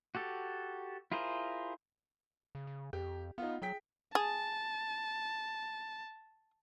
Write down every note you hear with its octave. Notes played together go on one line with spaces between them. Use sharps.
F#4 G4 A4
E4 F4 G#4 A#4 C5
C#3
C#3
F2 G4
B3 D#4 F4
F#3 G#4 G5 B6
G#4 A5